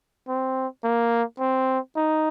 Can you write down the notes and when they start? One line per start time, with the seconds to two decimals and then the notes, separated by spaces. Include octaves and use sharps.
0.28 C4
0.84 A#3
1.40 C4
1.96 D#4